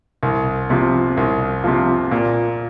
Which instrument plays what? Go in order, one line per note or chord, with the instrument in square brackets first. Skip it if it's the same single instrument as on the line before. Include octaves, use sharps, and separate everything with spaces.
[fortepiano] C2
C3 F3
C2
C3 F3
A#2